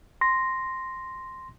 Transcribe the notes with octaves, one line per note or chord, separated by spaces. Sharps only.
C6 A#6